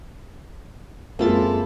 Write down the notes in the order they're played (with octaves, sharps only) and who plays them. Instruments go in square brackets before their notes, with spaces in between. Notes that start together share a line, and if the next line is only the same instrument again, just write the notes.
[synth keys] F#2 F4 A6 [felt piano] G#3 C4 [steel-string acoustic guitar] A#3 E4 [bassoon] A4